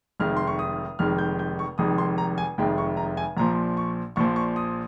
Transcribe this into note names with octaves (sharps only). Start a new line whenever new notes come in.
F1 F2 D#3 G#3 F6
C6
C#6
D#6
F1 F2 D#3 G#3 F6
G6
G6
C#6
F1 F2 D#3 G#3 D#6
C6
A#5
G#5
F1 F2 D#3 G#3 G5
C#6
A#5
G#5
A#1 A#2 F3 A#5
C#6
A#1 A#2 F3 C#6
C#6
D#6